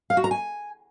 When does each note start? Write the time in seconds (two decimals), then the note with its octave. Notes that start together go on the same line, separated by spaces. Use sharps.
0.10 F5
0.17 F#4
0.24 A#5
0.31 G#5